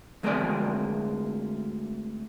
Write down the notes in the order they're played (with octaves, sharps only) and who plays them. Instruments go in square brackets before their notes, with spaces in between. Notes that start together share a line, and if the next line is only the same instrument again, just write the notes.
[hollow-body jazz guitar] D2 G#3 A#3 C4 G#4 D5